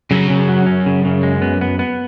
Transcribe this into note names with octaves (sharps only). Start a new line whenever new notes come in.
F#2 C#3
C#3
F#3
C#4
C#3
C#3
G#3
B3
B3
B3